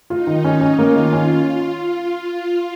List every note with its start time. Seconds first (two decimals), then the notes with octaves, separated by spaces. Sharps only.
0.10 D#4 F4
0.27 D#3
0.44 C#4
0.61 C#4
0.79 A#3 F4
0.96 D#3
1.13 C#4